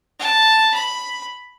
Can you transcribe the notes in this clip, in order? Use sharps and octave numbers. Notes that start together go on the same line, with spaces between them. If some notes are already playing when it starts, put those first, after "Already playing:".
A5
B5